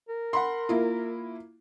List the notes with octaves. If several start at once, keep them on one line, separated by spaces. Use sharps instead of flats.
A#4
F#5 B5 C6
A#3 E4 F4